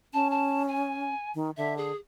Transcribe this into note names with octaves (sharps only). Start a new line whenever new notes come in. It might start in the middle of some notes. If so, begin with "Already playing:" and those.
C#4 A5
A5
G#5
D#3
D3 E5
G#4